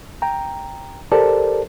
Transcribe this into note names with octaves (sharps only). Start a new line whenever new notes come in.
G5 A#5
G4 A4 A#4 C5 D5 A5